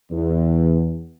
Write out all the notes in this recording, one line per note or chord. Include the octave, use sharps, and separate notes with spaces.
E2